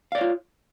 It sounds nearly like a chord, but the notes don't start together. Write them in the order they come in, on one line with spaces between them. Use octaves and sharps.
F5 D5 C#5 F4